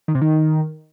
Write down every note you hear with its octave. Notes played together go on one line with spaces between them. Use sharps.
D#3
C3
D#3